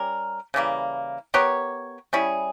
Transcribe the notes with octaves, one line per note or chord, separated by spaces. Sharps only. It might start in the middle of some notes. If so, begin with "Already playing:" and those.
Already playing: G3 C#4 G4 A#4
C#3 E3 G3 A#3
B3 G4 A#4 C#5
G3 C#4 E4 G#4